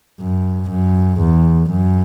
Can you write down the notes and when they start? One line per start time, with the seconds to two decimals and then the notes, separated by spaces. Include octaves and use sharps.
0.21 F#2
0.70 F#2
1.20 E2
1.70 F#2